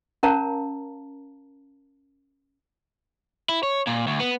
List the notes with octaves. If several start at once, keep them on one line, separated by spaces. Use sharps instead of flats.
C#4 A#4 C#5 F5 A5 A#5
E4
C#5
A#2
D2
B3